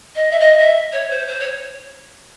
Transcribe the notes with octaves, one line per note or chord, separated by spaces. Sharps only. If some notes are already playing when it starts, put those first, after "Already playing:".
D#5
E5
D#5
E5
C#5
C5
C5
C#5